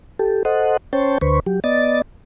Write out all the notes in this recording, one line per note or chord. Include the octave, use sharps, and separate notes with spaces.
G4 A4
A4 C5 D#5 F#5
C#4 C5 C#5 G5 A5
D2 D3 B4 C5 C#6
F#3 G4
B3 D5 D#5 A6